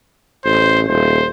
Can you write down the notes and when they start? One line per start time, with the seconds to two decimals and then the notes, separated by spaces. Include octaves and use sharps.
0.45 A1 C5
0.89 D#1 C5